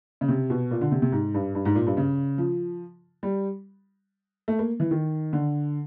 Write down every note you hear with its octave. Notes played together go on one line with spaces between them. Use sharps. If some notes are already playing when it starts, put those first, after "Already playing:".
C#3
C3
B2
A#2
D3
C3
C3
G#2
G2
G2
G#2
A#2
G2
C#3
F3
G3
A3
A#3
E3
D#3
D3